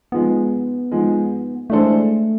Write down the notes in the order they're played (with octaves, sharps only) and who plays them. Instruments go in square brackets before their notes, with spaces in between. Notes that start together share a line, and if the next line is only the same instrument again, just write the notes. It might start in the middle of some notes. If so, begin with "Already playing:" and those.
[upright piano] G#2 F3 G#3 [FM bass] B3
[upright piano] G#2 F3 G#3
[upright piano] E3 G#3 D4 A4 C5 [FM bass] A3